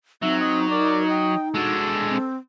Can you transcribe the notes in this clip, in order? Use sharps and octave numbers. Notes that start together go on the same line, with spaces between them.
F#3 C4 D#4 E5
D#5
A#4 D5
D#5 G5
G#3 D4 F#4 A4
C4